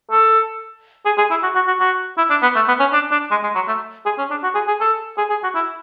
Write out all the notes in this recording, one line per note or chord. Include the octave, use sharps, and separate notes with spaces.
A4
G#4
G#4
E4
F#4
F#4
F#4
F#4
E4
D4
B3
A3
B3
C#4
D4
D4
G#3
G#3
F#3
A3
G#4
C#4
D4
F#4
G#4
G#4
A4
G#4
G#4
F#4
E4